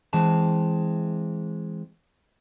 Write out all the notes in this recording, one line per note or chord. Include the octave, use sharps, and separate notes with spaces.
E3 G#3 C4 A5